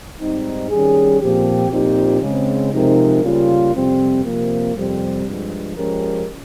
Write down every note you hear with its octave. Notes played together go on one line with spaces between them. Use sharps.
G#2 G3 C4 D#4
D#3 G3 C#4 G#4
A#2 F3 C4 G4
A#2 F3 C4 D#4 G4
C#3 G#3 C4
C3 F3 G#3 D#4 A#4
C#3 G3 A#3 F4
F2 C3 G3 C4
C3 F3 A#3
F2 C3 G3 C4
G2 F3 G#3
F3 G#3 C#4 G4 A#4